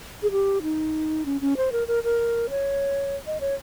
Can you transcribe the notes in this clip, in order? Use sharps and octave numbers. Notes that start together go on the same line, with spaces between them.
G#4
G4
D#4
C#4
C#4
C5
A#4
A#4
A#4
C#5
D#5
C#5